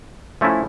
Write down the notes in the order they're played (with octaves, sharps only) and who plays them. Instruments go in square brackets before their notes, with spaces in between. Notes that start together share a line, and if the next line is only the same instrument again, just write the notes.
[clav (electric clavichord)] F3 A3 C#4 E4